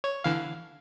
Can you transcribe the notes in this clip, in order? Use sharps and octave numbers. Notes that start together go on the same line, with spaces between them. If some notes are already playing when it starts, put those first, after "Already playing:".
C#5
D3 E3 F5